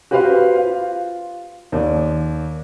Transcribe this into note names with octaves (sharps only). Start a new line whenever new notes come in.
F#4 G4 B4 C5 F5
F4
D#2 D5